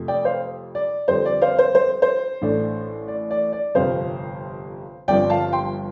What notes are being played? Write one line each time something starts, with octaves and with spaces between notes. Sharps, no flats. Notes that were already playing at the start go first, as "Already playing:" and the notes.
Already playing: F2 C3 A3
D5 G5
C5 F5
D5
F2 D3 G3 C4 C5
D5
C5 F5
C5
C5
C5
A1 A2 A3 D4
D5
D5
D5
G1 F2 C3 C5 F5
G1 G2 F3 C4 D5 G5
F5 A5
G5 C6